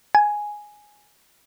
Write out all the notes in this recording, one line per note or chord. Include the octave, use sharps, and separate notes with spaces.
G#5